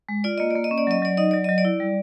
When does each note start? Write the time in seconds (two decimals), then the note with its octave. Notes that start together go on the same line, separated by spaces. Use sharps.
0.09 G#3
0.24 F4 D5
0.38 A#3 D#5
0.51 A#3 D5
0.64 D#5
0.71 C#4
0.78 D5
0.87 F#3 D#5
1.02 F#3 D5
1.17 D#4 D#5
1.31 F#3 D5
1.44 F#3 D#5
1.58 D5
1.65 E4
1.80 G3